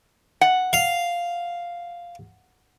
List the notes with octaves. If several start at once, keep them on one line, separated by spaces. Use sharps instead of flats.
F#5
F5